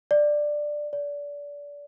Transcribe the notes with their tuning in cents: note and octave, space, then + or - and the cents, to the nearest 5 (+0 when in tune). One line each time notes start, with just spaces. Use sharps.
D5 +10
D5 -25